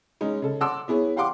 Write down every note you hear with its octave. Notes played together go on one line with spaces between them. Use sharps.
G#3 C#4 D#4
C#3 A4
F#5 A5 C6 D6 E6
B3 E4 G#4 C#5
G4 F5 F#5 C6 D6